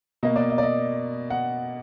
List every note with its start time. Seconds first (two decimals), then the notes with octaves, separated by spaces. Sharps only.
0.23 B2 A#3 D#5
0.36 D5
0.50 D#5
0.58 D5
0.63 D#5
1.30 F#5